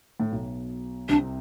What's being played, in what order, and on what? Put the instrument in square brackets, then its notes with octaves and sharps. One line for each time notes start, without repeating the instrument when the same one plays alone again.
[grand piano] A2
B1 B2
[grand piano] C2 C3 [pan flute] D4